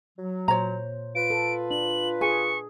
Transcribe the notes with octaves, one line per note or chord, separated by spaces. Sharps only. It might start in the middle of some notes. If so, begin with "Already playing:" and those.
F#3
A#2 C5 C#5 A#5
F4 B4 D7
A4
D4 F#7
G#4 G#5 C#6